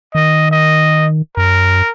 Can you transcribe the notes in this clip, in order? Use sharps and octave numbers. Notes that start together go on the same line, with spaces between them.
D#3 D#5
D#5
F#2 A#4